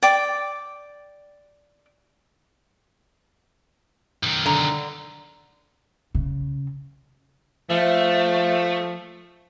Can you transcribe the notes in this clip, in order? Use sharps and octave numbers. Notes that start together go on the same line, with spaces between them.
D5 G5 D6
B1 D#3
D3 A#5
C#3
F3 A3